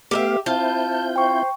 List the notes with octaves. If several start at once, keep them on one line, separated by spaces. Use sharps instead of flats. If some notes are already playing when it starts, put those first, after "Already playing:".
A3 B3 G4 G#4 E5 F5
C4 E4 F4 A5 G6
C5 G5 C#6